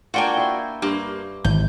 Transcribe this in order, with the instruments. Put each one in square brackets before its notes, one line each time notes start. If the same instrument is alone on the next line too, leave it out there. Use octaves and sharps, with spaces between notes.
[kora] A#3 D4 F4 [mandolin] F#4 G5 G#5
[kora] E4 C5
[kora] G2 C5 [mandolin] A#3
[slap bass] G#1 E3 [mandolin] G6